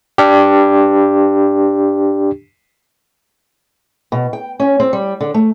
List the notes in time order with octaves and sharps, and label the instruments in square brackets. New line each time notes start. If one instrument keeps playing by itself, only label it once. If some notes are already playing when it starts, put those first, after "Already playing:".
[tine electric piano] D4 G4
[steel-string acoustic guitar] B2
G5
C#4
C4
G3
D3
A3